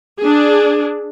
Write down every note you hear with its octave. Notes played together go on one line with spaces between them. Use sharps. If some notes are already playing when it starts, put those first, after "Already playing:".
D4 G#4